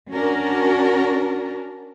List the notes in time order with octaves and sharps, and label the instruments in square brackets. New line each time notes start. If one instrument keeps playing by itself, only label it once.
[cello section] C#4 D4 F#4 A#4